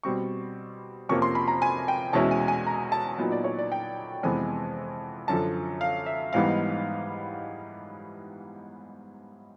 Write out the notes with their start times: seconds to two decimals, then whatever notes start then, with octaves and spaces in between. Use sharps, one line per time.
0.03 B2 G3 C4 C#6
1.09 F2 C3 F3 A#3 C#4 C#6
1.22 C6
1.35 B5
1.48 A#5
1.62 G#5
1.88 G5
2.13 E2 B2 G#3 C#4 E4 A5
2.31 G#5
2.48 G#5
2.67 A#5
2.92 A5
3.18 A#2 F#3 B3 D#4
3.32 D5
3.44 C#5
3.59 D5
3.72 G5
4.23 F2 C3 E3 G#3 B3 G#5
5.28 F#2 D3 F3 A5
5.81 F5
6.06 E5
6.33 G#2 E3 G3 B3 D#4 F5